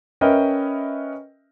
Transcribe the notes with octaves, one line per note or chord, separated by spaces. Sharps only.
C#4 A#4 B4 D#5 E5 G5